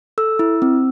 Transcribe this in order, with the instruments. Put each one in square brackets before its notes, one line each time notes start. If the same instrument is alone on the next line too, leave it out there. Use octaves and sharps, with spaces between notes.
[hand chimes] A4 E6
E4
C4